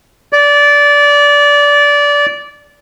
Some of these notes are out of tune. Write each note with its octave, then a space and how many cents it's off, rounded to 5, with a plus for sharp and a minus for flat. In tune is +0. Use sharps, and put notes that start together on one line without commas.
D5 -20